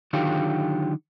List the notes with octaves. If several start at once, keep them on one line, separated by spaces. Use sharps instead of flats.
D3 D#3 F#3 F4 G4